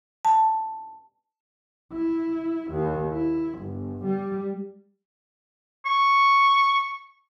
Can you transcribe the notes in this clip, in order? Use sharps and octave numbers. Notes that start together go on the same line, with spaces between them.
A5
E4
D#2
E4
G1
G3
C#6